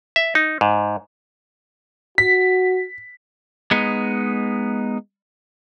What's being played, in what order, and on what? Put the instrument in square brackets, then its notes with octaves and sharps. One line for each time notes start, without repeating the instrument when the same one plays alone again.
[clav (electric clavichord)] E5
D#4
G#2
[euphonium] F#4 [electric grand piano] B6
[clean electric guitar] G#3 B3 D#4